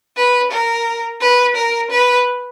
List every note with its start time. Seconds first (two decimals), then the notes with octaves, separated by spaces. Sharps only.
0.17 B4
0.51 A#4
1.21 B4
1.56 A#4
1.91 B4